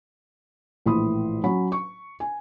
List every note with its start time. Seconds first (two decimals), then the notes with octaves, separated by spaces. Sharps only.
0.86 A#1 A2 E3 B5 C6 D#6
1.44 F#3 C#4 B5
1.72 C#6
2.20 G#5